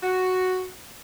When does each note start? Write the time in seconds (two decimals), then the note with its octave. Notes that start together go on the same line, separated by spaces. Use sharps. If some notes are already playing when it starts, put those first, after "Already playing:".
0.03 F#4